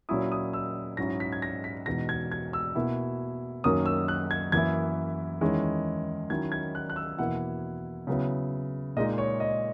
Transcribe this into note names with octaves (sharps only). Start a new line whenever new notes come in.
A#2 F#3 C#4 E4 D#6
D#6
E6
G#2 F#3 C#4 E4 A#6
B6
G#6
A#6
B6
E2 B2 G#3 D#4 A#6
G#6
G#6
E6
B2 A#3 E4
F#2 D#3 F#3 A#3 C#4 D#6
E6
F#6
G#6
F#2 E3 A#3 E4 G#6
E2 D#3 G#3 C#4 E4
D#3 F#3 C#4 E4 G#6
G#6
F#6
F#6
E6
E2 B2 A#3 E4 F#5
C#3 F#3 B3 E4
A#2 G#3 D#4 D#5
C#5
D#5